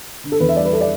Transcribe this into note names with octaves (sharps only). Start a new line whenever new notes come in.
D3
A4
E2 B4
E5
G3 D5
B4
A4
D5